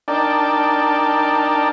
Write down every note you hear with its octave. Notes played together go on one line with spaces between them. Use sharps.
D4 D#4 A#4 D5 G5 A5